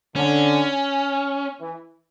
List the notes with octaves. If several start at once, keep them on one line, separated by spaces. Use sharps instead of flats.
D3 C#4
E3